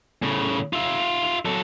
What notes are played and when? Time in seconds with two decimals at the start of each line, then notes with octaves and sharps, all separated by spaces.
0.23 A2 C#3
0.73 F4 E5
1.45 F#3 A4